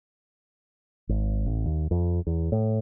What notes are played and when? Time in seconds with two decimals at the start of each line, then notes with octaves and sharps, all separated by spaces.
1.09 G#1
1.46 A1
1.66 D#2
1.91 F2
2.27 E2
2.52 A2